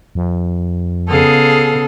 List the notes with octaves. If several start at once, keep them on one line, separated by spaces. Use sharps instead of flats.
F2
C#3 B3 G#4 A4 F5 D#6